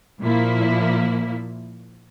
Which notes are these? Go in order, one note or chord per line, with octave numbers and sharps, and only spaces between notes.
A#2 F3 A#3 E4